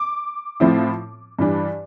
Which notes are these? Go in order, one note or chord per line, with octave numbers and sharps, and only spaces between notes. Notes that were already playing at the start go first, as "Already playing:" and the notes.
Already playing: D6
A2 F3 C4 E4
G2 E3 G3 D4